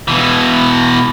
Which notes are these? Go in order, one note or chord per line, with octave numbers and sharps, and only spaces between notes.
B2 E3